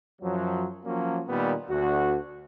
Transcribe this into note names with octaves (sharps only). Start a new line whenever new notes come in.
F#2 F3 F#3
F3 F#3 A#3 C#4
A#2 D#3 G3 B3
D2 F#4